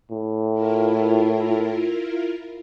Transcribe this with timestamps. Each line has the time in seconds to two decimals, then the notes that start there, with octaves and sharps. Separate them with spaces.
0.11 A2
0.52 E4 F4 A#4